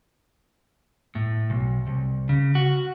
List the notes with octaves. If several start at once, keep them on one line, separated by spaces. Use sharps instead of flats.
A2
B1
C2
C#3
F#4